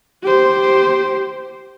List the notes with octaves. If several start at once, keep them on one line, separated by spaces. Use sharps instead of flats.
G4 C5